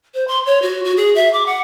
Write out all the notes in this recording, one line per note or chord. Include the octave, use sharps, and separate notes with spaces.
C5
C6
C#5
F#4
F#4
G#4
E5
D6
F#5